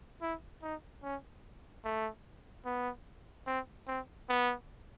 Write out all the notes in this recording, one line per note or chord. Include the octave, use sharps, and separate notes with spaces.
E4
D#4
C#4
A3
B3
C4
C4
B3